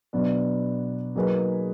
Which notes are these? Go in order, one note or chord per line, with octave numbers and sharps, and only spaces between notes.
B2 F#3 B3 D4
F#3 A#3 D#4 G#4 B4